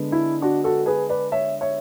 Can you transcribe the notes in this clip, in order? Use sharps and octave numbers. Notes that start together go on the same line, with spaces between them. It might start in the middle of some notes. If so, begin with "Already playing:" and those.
Already playing: D3 G#3 B3
E4
D4 F#4
F#4 A4
G#4 B4
B4 D5
C#5 E5
C#5 E5